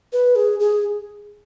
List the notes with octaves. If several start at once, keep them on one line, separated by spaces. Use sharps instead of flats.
B4
G#4
G#4